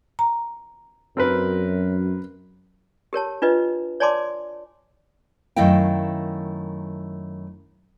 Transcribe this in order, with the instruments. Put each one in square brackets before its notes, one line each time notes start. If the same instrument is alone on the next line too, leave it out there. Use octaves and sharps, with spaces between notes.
[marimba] A#5
[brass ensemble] F#2 [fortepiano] C4 A#4 B4
[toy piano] G4 A#4 C#5 A5
D4 F4 B4 D#5
C#5 D5 G#5 A5 C6 D6
[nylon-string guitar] F#2 D#3 A3 E4 F5 G5